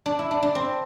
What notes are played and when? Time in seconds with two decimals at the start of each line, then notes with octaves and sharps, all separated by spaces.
0.06 D4
0.19 E4
0.31 D4
0.43 D4
0.55 C4